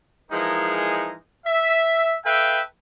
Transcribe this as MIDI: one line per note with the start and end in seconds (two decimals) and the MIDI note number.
0.31 1.14 52
0.31 1.14 53
0.31 1.14 56
0.31 1.14 63
0.31 1.14 68
0.31 1.14 70
1.46 2.16 76
2.25 2.59 69
2.25 2.59 71
2.25 2.59 76
2.25 2.59 77
2.25 2.59 79